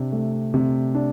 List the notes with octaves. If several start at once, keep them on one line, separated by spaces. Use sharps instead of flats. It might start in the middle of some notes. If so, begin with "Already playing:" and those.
Already playing: C3 D4
A3
C3
D4